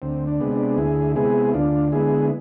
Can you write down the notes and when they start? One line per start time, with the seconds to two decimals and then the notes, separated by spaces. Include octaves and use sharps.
0.02 D2 C4
0.27 D4
0.40 C3 G#3 B3
0.52 D4
0.77 D2 E4 G#4
1.15 C3 G#3 B3 E4 G#4
1.54 D2 D4 F4
1.92 D3 G#3 B3 E4 G#4